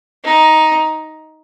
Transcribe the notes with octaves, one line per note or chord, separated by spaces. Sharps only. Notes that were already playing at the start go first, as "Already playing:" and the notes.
D#4